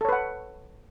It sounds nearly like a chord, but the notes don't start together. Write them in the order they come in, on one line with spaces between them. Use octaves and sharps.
A4 C#5 B4 F#5